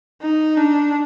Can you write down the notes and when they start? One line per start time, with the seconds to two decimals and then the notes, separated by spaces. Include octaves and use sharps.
0.22 D#4
0.57 D4